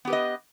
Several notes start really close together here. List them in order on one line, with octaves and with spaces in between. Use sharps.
B3 G4 B4 D#5